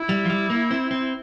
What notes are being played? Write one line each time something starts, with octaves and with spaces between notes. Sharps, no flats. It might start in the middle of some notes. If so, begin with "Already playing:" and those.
Already playing: E4
G3
F3
G3
A#3
C4
C4